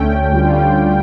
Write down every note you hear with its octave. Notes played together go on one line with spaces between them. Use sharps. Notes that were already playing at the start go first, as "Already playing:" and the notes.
Already playing: D2 D3 A3 C#4 G5
D2 D3 G3 C#4 F4